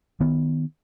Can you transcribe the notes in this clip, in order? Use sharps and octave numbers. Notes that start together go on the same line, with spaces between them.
D#3 B3